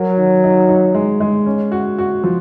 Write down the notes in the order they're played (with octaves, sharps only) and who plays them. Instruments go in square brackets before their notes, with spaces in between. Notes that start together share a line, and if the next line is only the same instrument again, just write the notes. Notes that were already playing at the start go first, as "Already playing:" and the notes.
Already playing: [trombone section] F#3 [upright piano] A#4
[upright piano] D#3
D#4
D#4
G#3
G#3
C#4
F#4
F#4
F3